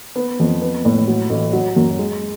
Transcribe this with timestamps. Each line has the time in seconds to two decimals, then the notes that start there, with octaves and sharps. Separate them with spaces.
0.16 B3
0.40 F2
0.62 B3
0.85 A2
1.07 F#3
1.30 A1
1.53 F#3
1.76 F#2
1.99 G#3